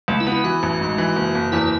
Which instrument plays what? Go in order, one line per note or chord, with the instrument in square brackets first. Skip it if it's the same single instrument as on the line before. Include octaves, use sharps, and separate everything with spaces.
[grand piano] C#2 [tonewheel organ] A3
[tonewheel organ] E4
[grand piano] B3
[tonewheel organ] E4
[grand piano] E3 [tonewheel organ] F#4
[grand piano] A1
G#2
E3
F#1
F#1
[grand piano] E2 [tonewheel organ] E4